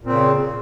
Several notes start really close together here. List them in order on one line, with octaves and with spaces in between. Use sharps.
A#2 C4 C#3